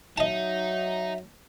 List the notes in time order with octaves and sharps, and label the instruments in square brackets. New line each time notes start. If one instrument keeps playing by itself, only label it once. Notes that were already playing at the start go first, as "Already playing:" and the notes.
[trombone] F#3 [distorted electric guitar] D#4 [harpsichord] D#5 A5 [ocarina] E5